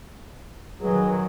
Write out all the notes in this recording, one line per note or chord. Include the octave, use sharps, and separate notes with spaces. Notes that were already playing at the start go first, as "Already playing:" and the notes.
D#3 F#3 G#4 B4 D#5